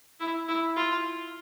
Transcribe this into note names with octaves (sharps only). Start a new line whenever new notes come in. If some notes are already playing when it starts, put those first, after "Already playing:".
E4
E4
F4